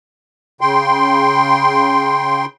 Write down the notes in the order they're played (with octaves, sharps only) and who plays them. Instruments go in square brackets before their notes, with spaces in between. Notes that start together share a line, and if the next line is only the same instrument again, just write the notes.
[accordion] C#3 G5 C6